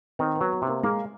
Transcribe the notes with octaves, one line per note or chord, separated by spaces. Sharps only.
D#3 C4
B3
F#3
B3
C3 A#3
G#3 A#3